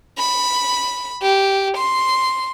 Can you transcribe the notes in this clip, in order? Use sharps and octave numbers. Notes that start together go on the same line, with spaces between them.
B5
G4
C6